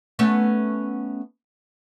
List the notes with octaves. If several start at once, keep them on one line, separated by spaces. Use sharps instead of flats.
A3 B3 C#4